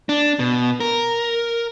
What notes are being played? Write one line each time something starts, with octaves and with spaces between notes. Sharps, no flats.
D4
B2
A#4